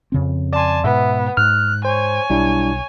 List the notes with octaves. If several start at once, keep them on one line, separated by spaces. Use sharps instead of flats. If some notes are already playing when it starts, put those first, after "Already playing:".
F2 C#3 C4
D5 G#5 A5 C6
G#2 B2 B3 E5
G#2 F6 F#6
C5 C#5 G#5
B1 G3 D4 E4